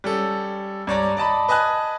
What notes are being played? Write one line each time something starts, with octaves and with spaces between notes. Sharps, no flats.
G3 C#4 A4
G2 C#5 D5 A#5
D5 D#5 A5 B5
B4 D#5 G#5 A5 F#6